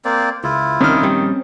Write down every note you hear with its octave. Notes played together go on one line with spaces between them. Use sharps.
A#3 C4 D5
C#2 E4 F4
C2 D#3 C4 C#4 F6
A#1 G3